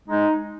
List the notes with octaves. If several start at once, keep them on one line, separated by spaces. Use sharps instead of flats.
G#3 D#4